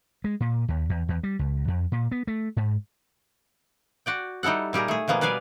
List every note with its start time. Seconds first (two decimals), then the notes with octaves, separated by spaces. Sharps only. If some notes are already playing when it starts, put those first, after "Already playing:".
0.24 G#3
0.40 A#2
0.68 D#2
0.90 E2
1.09 E2
1.23 G3
1.39 C#2
1.68 F2
1.92 A#2
2.11 B3
2.27 A3
2.57 G#2
4.06 F#4 D5 G5
4.43 G3 D#4 E4 A4 F#5
4.73 A#2 G3 G4 G#4 A#4
4.88 A3 G#4
5.08 B2 F3 A#3 B3 G#4
5.21 G3 B4 D5 F5 G#5